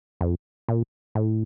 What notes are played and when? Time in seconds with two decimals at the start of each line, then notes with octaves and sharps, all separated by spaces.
0.21 F2
0.68 A#2
1.15 A2